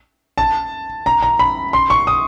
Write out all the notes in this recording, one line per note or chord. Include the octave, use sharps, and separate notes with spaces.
A5
A#5
A#5
B5
C6
C#6
D#6